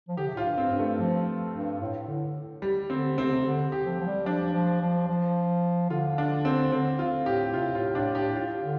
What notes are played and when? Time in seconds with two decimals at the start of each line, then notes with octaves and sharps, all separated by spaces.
0.08 F3
0.17 D3 G4
0.26 C3
0.35 A2 F4
0.44 G2
0.58 C4
0.72 G2
0.79 A3
0.99 F3
1.53 G2
1.81 A2
2.08 D3
2.62 G3
2.90 D3 C4
3.17 C3 C4
3.25 D3
3.33 C3
3.45 D3
3.72 G4
3.86 F3
4.00 F3
4.06 G3
4.26 F3 D4
4.53 F3
4.81 F3
5.08 F3
5.90 D3 F4
6.18 D4
6.45 C4
6.72 D3 C4
6.99 F4
7.26 A2 G4
7.53 C3 F4
7.74 A2 F4
7.95 A2 D4
8.15 A2 G4
8.36 F4
8.63 D3